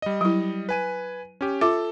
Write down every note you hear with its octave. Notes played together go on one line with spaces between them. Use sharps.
G3 D#5
F#3 E4
B4 G#5 D#7
C#4 G4
F4 A4 E5 D6